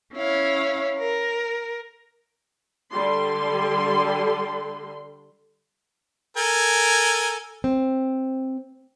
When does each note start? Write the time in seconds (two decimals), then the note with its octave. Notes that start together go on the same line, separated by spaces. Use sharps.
0.14 C#4 E4 C#5 F5
0.99 A#4
2.91 D3 G3 C6
6.37 A4 A#4 G#5
7.64 C4